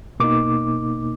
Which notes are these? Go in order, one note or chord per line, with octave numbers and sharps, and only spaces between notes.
B2 A#3 D#4 D6